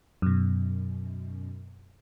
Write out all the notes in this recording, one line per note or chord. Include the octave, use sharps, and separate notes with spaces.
F#2 B2